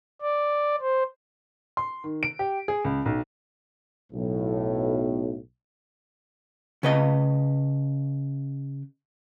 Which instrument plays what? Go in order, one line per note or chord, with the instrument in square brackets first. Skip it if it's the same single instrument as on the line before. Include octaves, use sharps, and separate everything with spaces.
[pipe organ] D5
C5
[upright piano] C6
D#3
D7
G4
G#4
C#2
B1
[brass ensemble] B1 A2
[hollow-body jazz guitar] C#3 B4 D#5